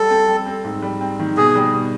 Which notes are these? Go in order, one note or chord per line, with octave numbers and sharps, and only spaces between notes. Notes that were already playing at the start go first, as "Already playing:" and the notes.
Already playing: G3 A4
C4
G3
C4
G#2
G3
C4
D#3
B2 G#4
G3
B2